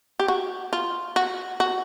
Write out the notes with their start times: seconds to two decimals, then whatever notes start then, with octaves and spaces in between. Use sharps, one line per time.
0.19 G4
0.28 F#4
0.73 F4
1.16 F#4
1.60 F#4